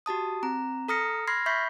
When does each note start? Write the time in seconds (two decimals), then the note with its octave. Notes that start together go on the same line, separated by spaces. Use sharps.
0.06 F#4 G4 A5 D#6
0.43 C4 A#5
0.88 A4 A#5 D#6 F6 A#6 C#7
1.27 B5 C6 F6 G#6 A#6 C7
1.46 E5 B5 C#6 G6 B6 C7